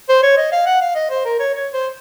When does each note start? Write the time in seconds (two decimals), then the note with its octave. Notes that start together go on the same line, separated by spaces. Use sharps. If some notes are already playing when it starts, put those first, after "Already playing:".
0.09 C5
0.23 C#5
0.37 D#5
0.52 F5
0.66 F#5
0.81 F5
0.95 D#5
1.10 C5
1.25 A#4
1.40 C#5
1.54 C#5
1.73 C5